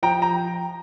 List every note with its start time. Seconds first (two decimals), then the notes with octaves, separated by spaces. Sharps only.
0.03 F3 G5 A#5
0.22 A#5